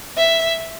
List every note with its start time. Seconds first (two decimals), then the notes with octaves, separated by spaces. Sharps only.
0.17 E5